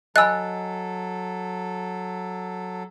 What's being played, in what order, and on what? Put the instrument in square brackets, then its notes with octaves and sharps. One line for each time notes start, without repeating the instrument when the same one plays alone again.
[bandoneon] F#3 A4 [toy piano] D#5 G#5 B5 [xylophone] E6 F#6